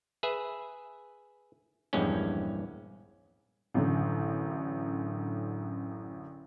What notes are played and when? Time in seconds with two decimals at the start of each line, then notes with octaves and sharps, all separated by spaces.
0.23 G#4 B4 E5
1.93 A#1 E2 G2 G#3 C#4
3.74 A1 F#2 D3